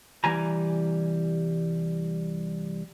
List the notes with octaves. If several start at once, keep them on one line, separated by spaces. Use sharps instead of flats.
C2 E3 G3 G#5 A#5